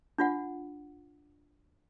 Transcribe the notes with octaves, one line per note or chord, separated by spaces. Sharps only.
D4 F4 F#5